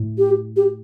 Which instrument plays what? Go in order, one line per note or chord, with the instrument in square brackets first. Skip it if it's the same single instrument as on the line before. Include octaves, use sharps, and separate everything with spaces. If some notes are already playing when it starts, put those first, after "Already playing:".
Already playing: [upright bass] A2
[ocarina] G4
G4